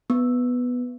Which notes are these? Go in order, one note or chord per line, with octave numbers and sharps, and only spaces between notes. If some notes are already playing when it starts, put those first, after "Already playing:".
B3